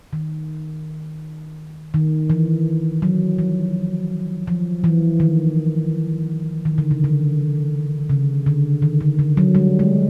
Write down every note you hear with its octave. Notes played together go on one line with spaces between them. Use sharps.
D#3
D#3
E3
F#3
F3
F3
E3
D#3
D#3
D3
C#3
D3
C#3
D3
D#3
D3
D3
F#3
G3
G#3